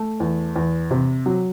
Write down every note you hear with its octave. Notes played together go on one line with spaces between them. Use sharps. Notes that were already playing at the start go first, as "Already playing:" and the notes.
Already playing: A3
E2
E2
C3
F#3